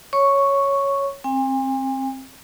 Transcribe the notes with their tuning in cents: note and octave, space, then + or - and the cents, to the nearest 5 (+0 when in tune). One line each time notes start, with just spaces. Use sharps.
C#5 +0 C#6 +0
C4 +20 G#5 -45